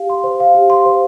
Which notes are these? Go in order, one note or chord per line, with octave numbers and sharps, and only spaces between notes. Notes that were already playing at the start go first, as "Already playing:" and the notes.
Already playing: G4 F5
C6
C5
F5
G4
C6
C5